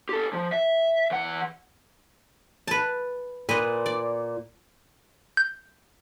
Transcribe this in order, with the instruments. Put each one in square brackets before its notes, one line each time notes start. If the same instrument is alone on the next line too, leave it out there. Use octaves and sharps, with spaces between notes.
[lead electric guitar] G4 A4
F3
E5
E3 F#5
[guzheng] B4 A5
[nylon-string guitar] A#2 [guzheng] B4 D#5
[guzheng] D5
[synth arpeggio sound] G6